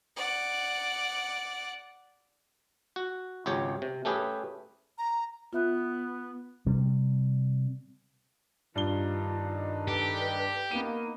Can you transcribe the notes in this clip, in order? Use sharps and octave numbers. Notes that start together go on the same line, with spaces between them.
D5 F#5
F#4
G#1 C#2 G4 C#5
C3
A3 C#4 G4 G#4 B4
A#5
B3 F4 E5 F#6
C3 G3
G2 D#3 D4 D#4 F4 G7
G4 A4 B4
A#3 B3 D#4 D#7